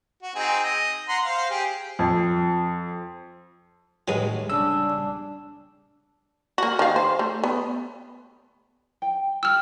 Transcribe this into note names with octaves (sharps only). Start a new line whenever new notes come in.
F#4
C4 D#4 G#4
D#5
F#5 A#5 C6
C5 F5
G4 G#4
F2
D#2 A2 F#3 G#3 G#4 B4
C#3 G3 D4 E6
A#3 F#4
D#3 F5
C5
A3
B3
G5
G4 E6 F6